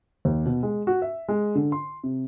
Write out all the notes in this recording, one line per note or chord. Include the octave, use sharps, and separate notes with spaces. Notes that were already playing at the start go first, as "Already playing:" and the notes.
D#2
B2
G#3
F#4
E5
G#3
D3
C6
C3